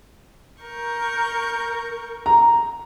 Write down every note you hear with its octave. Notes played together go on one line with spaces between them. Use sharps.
A#4 C#6 G6
A#5